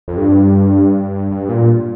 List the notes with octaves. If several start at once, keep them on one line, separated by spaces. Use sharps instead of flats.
F2
G2
G2
A#2